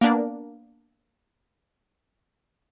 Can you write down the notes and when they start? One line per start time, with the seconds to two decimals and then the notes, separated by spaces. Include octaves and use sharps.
0.01 A#3 B3 D4